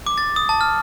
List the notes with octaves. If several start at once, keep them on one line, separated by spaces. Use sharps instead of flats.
D6
A6
D#6
A5
F6